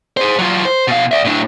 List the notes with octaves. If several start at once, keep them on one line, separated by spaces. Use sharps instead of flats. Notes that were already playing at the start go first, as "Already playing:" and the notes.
G#4 C5
F#3 F4
C5
B2 F5
D5 E5
A2 D4